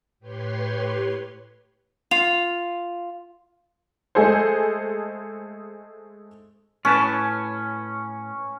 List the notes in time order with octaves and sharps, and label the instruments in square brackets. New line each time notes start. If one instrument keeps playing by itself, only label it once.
[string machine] A2 G4 B4 C#5 C6
[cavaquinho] F4 [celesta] F7
[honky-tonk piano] G#3 A3 G#4 A4 C5
[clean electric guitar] A2 B4 A5 [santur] C#4